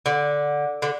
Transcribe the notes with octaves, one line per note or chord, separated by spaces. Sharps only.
D3
D3